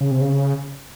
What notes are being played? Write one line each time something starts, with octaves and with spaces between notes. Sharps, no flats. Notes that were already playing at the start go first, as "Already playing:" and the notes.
C#3
C3
C#3